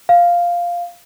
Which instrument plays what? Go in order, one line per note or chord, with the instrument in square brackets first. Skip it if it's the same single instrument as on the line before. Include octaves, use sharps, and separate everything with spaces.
[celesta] F5